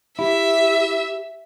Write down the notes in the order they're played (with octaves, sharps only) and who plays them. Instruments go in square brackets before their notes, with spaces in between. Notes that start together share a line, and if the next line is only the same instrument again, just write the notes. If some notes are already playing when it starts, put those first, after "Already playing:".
[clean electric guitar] E4 [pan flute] G4 [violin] E5